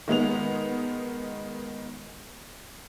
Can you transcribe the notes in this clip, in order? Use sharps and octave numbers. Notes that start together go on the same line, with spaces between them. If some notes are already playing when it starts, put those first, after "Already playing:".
D#3 G#3 B3 F7